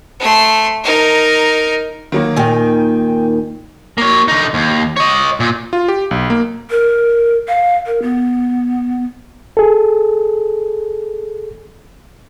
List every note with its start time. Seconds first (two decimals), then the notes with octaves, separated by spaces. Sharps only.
0.20 A3 C6
0.84 D#4 A#4
2.12 D#3 F#3 A#3
2.36 D#2 A#2 D#3 G5 G#5
3.98 A#3 C#5
4.28 D3 D#4
4.54 D#2
4.97 C#5 D#5
5.40 A#2
5.73 F4
5.88 G4
6.11 B1
6.30 A#3
6.70 A#4
7.48 F5
7.86 A#4
8.02 B3
9.57 G#4 A4